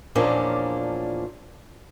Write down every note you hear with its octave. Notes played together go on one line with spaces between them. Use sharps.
E2 A#2 F3 A#3 C#4 D4